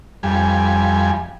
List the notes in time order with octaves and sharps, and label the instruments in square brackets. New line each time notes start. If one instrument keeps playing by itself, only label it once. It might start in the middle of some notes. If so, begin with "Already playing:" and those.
[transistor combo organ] F2 G3 G#5